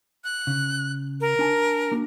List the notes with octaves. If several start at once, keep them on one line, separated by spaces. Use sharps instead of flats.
F#6
C#3
A#4
D4 G#5 A5
A#3 D4 F#4